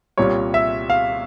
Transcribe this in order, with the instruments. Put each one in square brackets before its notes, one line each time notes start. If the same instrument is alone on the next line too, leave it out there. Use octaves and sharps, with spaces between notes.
[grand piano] C2 A#2 G3 C#5
E5
F5